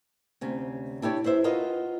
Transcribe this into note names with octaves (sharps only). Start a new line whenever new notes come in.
D2 C3 C#4
D4 E4 G4 C#5 D5
E4 B4 C5 E5
F4 F#4 A#4 B4 D#5